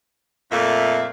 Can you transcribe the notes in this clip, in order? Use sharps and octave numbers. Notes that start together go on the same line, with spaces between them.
F2 A#2 A3 D5 E5 F5